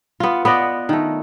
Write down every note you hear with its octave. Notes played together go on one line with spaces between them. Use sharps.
B3 F4
B3 B4 D5 D#5
D#3 A3